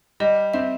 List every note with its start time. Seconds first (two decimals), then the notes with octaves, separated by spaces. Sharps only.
0.20 G3 D#5
0.54 C4 E5